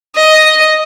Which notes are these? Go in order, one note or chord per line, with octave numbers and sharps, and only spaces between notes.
D#5